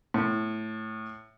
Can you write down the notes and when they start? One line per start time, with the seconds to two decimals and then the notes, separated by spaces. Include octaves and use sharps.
0.14 A2